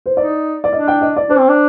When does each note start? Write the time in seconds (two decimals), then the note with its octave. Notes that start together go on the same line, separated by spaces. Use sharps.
0.06 C5
0.17 D#4 D5
0.64 D5
0.73 D4 D#5
0.88 G5
1.01 D#5
1.16 D5
1.29 D4 C5
1.39 C4
1.49 D4